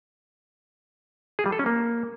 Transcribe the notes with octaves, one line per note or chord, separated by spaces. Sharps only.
G#4
G3
A4
C#4
A#3